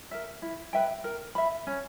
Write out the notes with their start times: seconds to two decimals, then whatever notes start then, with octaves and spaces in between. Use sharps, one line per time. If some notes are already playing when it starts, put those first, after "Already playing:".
0.11 A#4 E5
0.42 E4
0.73 B4 E5 G5
1.04 A#4
1.35 E5 B5
1.67 C#4